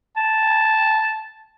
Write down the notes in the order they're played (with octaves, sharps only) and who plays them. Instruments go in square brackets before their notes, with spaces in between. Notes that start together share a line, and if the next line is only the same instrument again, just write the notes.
[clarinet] A5